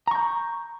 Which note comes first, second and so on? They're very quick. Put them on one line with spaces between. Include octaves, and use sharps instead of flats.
A#5 C#6 G6